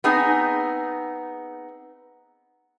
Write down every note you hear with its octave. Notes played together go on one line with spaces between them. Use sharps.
B3 C4 D#4 G#4 G#5